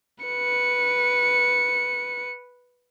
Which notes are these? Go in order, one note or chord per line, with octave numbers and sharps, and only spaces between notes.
B4 C#7